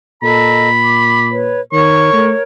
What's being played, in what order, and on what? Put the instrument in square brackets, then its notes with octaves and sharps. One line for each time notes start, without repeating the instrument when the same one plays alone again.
[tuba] A#2 [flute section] A4 D#5 A#5 [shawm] B5
[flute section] D6
B4 C#5
[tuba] D#3 [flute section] A#4 C#5 [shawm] C#6
[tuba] A3